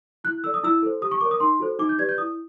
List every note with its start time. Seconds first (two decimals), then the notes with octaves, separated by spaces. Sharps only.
0.24 E4 F#6
0.44 A4 D5 E6
0.54 D#6
0.63 E4 E6
0.82 A4 C5
1.01 G4 D#6
1.11 C#6
1.21 A#4 C#5 D6
1.31 D#6
1.40 D#4 C6
1.59 F#4 A4 C5
1.79 D#4 D6
1.89 G6
1.98 G4 B4 D5 G#6
2.09 G6
2.18 E4 D#6